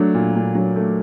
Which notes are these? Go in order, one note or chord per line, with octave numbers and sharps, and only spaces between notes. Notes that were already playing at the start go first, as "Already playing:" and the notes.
Already playing: F#3 A3 D4
A#2
A#2
F#3
A3